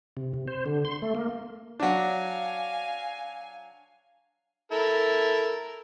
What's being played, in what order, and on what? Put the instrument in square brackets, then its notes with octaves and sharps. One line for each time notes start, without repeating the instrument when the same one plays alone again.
[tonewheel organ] C3
C3
C5
D3
C6
A3
A#3
[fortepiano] F#3 D4 [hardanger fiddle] F5 G#5
[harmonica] E4 A4 A#4